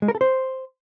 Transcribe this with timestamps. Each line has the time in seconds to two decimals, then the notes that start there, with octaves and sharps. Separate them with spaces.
0.02 G#3
0.08 A#4
0.15 A4
0.21 C5